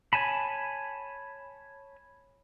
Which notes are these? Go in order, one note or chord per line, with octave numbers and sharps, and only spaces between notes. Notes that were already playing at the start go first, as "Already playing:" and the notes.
C#5 G#5 A5 B5